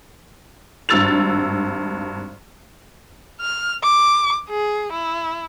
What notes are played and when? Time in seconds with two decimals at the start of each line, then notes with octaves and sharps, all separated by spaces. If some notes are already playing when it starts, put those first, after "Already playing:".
0.89 G#1 G2 E6 A6 F7
3.41 F6
3.83 D6
4.49 G#4
4.92 E4